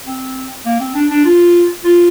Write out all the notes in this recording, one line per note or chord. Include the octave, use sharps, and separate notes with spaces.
C4
A#3
C4
D4
D4
F4
F4